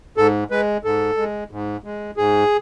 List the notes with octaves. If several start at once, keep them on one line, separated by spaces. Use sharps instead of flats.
G#2 A4
G#3 B4
G#2 A4
G#3
G#2
G#3
G#2 G#4